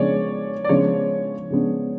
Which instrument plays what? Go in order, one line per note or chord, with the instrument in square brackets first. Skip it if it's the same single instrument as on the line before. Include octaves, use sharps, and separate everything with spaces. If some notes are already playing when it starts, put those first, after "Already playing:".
Already playing: [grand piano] C#3 F3 G#3 B3 D4 [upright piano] C#5 D5
[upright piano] D5
[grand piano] C#3 F3 G#3 B3 D4 [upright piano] C#5
[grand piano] C#3 F3 G#3 B3 D4